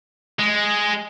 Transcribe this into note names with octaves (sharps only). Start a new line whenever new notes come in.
G#3